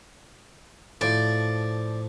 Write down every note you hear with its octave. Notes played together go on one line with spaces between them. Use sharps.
A2 F3 D5